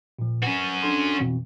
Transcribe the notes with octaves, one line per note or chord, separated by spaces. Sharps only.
A#2 F3
C#4 F#4 B4 G#5
D4 A4 C6
F2 B2 E3